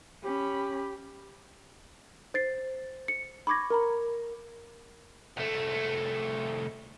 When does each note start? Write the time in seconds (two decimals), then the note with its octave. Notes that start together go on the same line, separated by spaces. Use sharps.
0.23 C#4 G4 B5
2.34 C5 A6 C7
3.08 C#7
3.47 B5 C#6 D6 G#6 A#6
3.70 A#4 A#5 B5
5.37 C2 A3